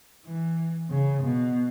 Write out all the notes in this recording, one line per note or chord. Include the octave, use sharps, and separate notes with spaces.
E3
C#3
B2